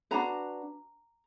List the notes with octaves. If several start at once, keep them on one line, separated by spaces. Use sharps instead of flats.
D4 F#4 B4 A#5